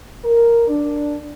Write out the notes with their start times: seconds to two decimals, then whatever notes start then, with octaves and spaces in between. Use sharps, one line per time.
0.25 A#4
0.67 D4